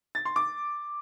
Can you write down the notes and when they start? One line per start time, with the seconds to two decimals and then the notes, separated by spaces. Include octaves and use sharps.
0.15 A6
0.25 C6
0.36 D6